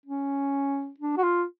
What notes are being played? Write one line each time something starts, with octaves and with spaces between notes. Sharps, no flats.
C#4
D4
F#4
F4